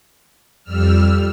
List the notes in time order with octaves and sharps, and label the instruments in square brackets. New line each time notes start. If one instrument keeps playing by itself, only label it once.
[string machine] F2 G3 E6 F6